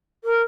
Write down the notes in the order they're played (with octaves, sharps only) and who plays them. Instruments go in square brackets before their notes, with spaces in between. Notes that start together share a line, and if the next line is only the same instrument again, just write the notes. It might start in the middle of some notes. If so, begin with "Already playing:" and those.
[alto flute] A#4